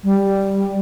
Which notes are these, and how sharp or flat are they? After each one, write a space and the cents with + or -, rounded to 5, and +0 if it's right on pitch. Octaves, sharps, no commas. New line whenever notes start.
G3 +0